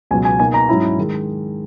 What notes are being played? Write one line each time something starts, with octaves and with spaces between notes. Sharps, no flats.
C#2 B2 F#3 G#5
G#5
B2 A#3 D#4 G#5
A#5
G#2 F#3 C#4 E4
D#3 G#3